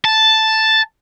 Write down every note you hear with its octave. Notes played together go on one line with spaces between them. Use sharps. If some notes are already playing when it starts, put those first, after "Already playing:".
A5